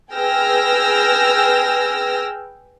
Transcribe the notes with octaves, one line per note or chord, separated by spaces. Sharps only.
G#4 B4 G5 E6 F6 A#6